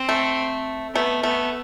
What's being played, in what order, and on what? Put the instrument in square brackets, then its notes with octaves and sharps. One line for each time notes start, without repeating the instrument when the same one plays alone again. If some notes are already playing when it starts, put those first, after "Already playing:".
Already playing: [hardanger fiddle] C4
[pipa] A3
[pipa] A3 [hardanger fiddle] B3
[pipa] A3 [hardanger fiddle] B3